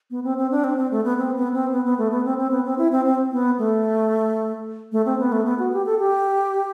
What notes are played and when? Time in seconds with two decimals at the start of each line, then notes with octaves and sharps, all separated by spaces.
0.11 B3
0.24 C4
0.38 C4
0.51 D4
0.64 C4
0.78 C4
0.91 A3
1.05 B3
1.18 C4
1.36 B3
1.53 C4
1.72 B3
1.85 B3
1.98 A3
2.12 B3
2.25 C4
2.38 C4
2.51 B3
2.65 C4
2.78 E4
2.92 C4
3.05 C4
3.32 B3
3.59 A3
4.92 A3
5.06 C4
5.19 B3
5.32 A3
5.46 B3
5.59 F#4
5.73 G4
5.86 A4
5.99 G4